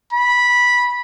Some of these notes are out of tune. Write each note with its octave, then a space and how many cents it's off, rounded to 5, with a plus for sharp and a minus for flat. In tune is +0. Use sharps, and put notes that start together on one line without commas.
B5 -10